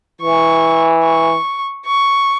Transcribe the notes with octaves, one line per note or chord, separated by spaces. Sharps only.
E3 C#6
C#6
C#6